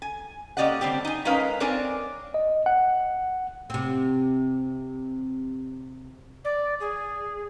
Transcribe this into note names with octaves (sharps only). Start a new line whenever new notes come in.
G#5
A#3 C#4 G4 D5 D#5 F#5
D3 G3 C4 G4
D#4 G#5
G#3 C#4 D#4 A#4 B4 F5
C4 D4 A#4 C#5 D5 G#5
D#5
F#5
C3 C4
D5
G#4